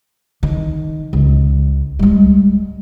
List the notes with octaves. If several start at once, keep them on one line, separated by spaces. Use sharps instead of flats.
D#3
C#2
G3 G#3